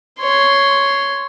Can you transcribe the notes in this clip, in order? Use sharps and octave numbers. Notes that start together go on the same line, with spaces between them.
C#5 C6